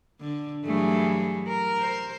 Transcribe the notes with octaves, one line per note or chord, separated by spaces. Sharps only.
D3
G2 E3 F#3 A3 G#4
A#4
C5